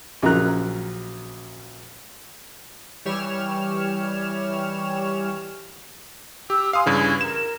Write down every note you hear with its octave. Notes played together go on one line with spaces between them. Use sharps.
A#1 C#3 F#3 A#4 A#5 F#6
E3 G3 G4 C#5 F6 E7
G4 E6
F5 G#5 C6 D#6
G2 C#3 E3 G#6
A#4 E7